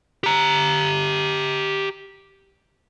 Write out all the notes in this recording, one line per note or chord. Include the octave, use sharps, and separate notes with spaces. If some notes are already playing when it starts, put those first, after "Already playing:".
G4 A#5